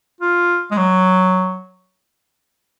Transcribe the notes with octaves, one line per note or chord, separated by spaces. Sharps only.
F4
G#3
F#3